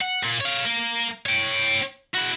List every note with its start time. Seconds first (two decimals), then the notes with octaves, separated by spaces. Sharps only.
0.02 F#5
0.23 A#2
0.41 C#5 F5
0.65 A#3 A#4
1.26 C#5 G5
2.14 E4 F#4